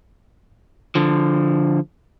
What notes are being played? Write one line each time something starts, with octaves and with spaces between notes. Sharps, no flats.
D3 F3